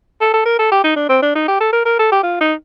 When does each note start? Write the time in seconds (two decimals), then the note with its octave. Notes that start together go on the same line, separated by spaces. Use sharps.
0.21 A4
0.34 A4
0.46 A#4
0.59 A4
0.72 G4
0.84 D#4
0.96 D4
1.09 C4
1.22 D4
1.36 D#4
1.48 G4
1.60 A4
1.73 A#4
1.86 A#4
1.99 A4
2.12 G4
2.23 F4
2.41 D#4